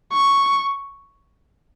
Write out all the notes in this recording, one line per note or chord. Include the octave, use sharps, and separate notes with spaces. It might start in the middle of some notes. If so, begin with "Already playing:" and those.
C#6